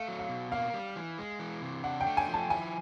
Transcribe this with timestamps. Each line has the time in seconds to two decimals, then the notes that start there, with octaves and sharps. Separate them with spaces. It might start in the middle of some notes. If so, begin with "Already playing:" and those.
Already playing: A3 F5
0.08 F#3
0.19 F5
0.29 B2
0.52 A#3 F5
0.74 G3
0.96 E3
1.19 G#3
1.39 E3
1.62 C3
1.84 D4 F#5
2.01 G5
2.07 A3
2.17 G#5
2.28 F3
2.34 A5
2.50 E4 G#5